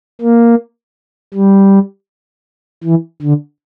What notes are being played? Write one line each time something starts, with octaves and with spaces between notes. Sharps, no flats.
A#3
G3
E3
D3